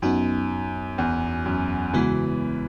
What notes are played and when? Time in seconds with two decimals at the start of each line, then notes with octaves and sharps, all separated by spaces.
0.02 F#2 B3 D#4 F#4
0.98 E2
1.46 F#2
1.93 C#3 E3 G#3 B3 F#4